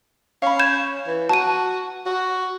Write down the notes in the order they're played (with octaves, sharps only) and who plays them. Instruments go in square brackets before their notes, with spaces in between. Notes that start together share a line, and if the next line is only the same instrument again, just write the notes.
[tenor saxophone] C#4 [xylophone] F5 B5
[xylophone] G6 G#6 E7
[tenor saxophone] E3
[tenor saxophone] F#4 [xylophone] A5 D#7
[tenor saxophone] F#4